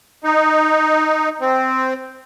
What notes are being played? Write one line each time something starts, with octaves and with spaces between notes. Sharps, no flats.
D#4
C4